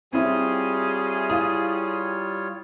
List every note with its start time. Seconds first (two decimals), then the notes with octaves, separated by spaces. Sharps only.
0.13 G3 C4 E4 F4 G4 G#4 C#5
1.30 E4 F5 D#6